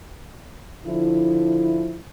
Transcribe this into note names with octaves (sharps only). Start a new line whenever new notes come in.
D3 F3 E4